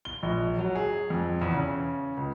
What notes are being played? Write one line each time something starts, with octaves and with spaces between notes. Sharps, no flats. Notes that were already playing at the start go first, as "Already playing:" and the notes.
G7
A#1
F#3
G#4
F2
E2
C#3
C#2